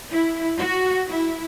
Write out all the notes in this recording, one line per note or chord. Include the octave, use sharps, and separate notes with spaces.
E4
F#4
E4